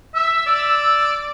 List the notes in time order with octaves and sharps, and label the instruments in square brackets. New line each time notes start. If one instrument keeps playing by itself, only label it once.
[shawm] E5 [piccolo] E6
[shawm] D5